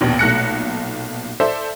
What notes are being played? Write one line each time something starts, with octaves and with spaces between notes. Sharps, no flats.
A#1 D#2 B2
B1 A#2 A3 F#6 A#6 C#7
A4 C5 D5 E5